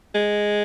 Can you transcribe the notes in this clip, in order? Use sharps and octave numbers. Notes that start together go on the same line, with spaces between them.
G#3